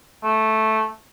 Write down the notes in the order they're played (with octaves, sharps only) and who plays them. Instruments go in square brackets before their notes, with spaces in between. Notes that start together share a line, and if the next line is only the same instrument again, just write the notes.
[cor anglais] A3